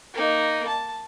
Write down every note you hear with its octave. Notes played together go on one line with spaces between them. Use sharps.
A#3 D#4
A5